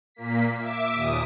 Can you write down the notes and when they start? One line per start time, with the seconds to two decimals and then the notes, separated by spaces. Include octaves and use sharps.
0.15 A#2 A#3 B6
0.58 E5 D6
0.94 D#2 A#2 D#6